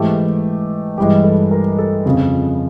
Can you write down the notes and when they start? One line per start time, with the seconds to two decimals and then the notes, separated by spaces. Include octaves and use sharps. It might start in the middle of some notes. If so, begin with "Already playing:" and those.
Already playing: G#2 E3 A3 G4
0.97 G2 E3 G#3 G4
1.24 A4
1.51 A#4
1.78 A4
2.05 F2 C#3 F3